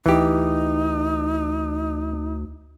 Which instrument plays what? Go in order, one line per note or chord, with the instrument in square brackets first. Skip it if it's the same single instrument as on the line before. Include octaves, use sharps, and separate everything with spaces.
[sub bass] D2 [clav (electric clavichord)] E3 G4 [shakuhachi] D#4